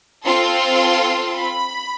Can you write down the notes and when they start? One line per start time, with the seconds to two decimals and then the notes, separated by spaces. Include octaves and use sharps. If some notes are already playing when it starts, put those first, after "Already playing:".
0.24 C4 F4 A4 C6
1.36 B5